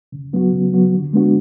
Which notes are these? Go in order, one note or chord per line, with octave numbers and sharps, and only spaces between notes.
C#3
F#3 B3 F#4
C#3
F#3 B3 F#4
D3
G#3 B3 D4 F#4